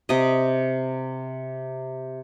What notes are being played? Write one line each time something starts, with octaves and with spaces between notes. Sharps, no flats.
C3 D#5